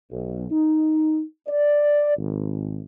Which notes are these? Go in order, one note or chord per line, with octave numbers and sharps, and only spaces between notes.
B1
D#4
D5
G#1